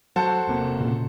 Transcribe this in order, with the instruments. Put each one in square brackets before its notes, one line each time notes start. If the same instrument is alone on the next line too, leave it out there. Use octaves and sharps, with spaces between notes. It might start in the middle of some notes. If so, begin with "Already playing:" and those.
[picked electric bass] F#3 [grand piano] F#4 A4 C5
[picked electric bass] E1 C3 A#3
[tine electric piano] A#2 C#3